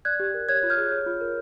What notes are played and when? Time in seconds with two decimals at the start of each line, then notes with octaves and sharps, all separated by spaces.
0.05 D5 F#6 G#6
0.20 G4
0.34 A#4
0.49 C#5 F#6 G#6
0.63 F4
0.70 F6 G6
0.78 G#4
0.92 C#5
1.06 F4
1.21 A#4